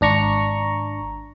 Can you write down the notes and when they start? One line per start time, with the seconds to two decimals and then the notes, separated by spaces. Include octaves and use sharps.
0.01 G#1 D4 A#5 C#6